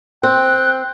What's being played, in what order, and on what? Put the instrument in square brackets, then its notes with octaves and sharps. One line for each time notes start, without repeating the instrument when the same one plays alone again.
[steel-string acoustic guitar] C4 [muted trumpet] G5 [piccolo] F#6